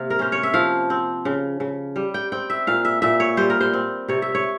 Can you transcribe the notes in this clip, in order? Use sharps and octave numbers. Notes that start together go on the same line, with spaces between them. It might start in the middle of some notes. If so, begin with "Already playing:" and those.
Already playing: C3 A#3 F5
A#4
C#4 C5
C#5
E5
F3 F5
C4
C#3
C#3
G3
G5
C4 G5
E5
A#2 F5
E5
A#2 E5
C#5
G3 C5
A#4
C5
C4
C3 C#5
E5
C#5